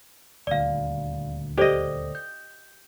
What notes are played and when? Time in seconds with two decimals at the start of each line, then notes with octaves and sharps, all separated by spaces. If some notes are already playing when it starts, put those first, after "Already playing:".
0.47 D#1 D2 D5 F5
1.58 G4 A4 C5 D5 D#5
2.15 G6